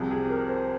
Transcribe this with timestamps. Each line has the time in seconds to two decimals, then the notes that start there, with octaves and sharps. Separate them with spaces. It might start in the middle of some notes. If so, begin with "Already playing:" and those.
Already playing: C2 C3 F3 G#4
0.11 G#4
0.30 A#4
0.49 C5